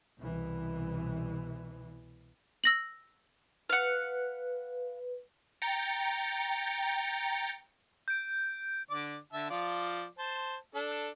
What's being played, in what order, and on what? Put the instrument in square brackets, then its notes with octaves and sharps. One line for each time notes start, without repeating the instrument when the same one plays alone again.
[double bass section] C2 B2 E3
[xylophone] E6 A#6 F#7
[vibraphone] B4 [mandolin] F5 F#5
[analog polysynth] G5 A#5 A6 C#7
[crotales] G6 D7
[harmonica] D3 D5 D6
D3 E5 A5
F3 F4 D5
C5 A5
D4 A4